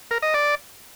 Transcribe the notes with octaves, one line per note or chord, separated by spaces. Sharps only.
A#4
D#5
D5